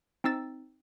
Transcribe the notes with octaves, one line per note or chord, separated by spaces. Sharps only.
C4 D#4 E6 A6